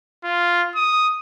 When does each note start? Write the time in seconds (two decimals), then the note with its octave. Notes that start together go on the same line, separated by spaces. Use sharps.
0.24 F4
0.75 D#6